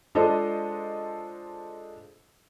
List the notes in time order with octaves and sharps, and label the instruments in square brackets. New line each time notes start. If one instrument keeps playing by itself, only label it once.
[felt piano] G#3 D4 F4 A4 C5 D#5